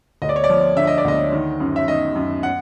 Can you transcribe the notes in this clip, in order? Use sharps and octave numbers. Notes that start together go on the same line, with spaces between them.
D2 D#5
D5
C#5
D5
F3
D3 E5
D#5
D5
D2 D#5
D#3
F#2
E5
D#3 D#5
F#2
F#5